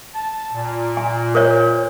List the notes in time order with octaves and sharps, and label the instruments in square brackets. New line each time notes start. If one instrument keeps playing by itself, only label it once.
[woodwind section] A5
A#2
[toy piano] G#5
A#4 C5 C#5